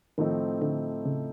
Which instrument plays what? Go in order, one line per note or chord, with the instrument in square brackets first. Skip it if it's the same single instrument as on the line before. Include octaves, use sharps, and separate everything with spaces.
[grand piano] A2 F3 A3 C4 D#4 [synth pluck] D#3
[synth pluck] D3
C#3